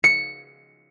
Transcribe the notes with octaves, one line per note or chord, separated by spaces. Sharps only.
C#7